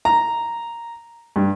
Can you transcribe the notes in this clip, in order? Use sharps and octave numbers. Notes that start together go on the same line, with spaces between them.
A#5
G2